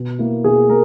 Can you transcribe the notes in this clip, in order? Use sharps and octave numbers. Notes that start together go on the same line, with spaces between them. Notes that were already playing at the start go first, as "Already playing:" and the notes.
Already playing: B2
A#3 E4
B2 G#4
A#3 A#4